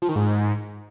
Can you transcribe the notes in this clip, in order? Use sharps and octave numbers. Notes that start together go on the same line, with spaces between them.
F3
D#3
G#2